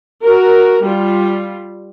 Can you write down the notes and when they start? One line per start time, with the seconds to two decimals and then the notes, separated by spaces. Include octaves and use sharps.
0.23 F#4 A#4
0.82 G3 F4